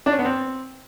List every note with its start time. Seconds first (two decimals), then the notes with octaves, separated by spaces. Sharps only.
0.06 D4
0.12 C#4
0.19 B3
0.25 C4